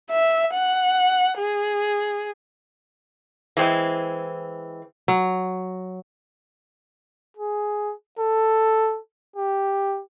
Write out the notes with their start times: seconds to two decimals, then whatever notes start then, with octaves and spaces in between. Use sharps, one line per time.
0.11 E5
0.54 F#5
1.38 G#4
3.57 E3 G#3 C4
5.08 F#3
7.37 G#4
8.19 A4
9.36 G4